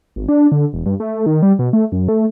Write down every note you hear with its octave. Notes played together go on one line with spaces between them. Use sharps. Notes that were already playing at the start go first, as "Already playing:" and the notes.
G#1
D4
D3
E1
G2
A3
D#3
G3
B2
A3
F#2
A3